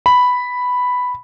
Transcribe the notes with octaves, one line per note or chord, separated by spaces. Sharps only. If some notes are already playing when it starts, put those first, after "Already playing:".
B5